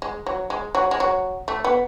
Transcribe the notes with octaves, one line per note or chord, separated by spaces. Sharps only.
G#3
F#3
G#3
F#3
G#3
F#3
A3
B3